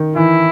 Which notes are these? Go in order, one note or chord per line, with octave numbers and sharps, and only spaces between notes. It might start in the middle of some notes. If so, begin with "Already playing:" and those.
Already playing: D#3
E3 E4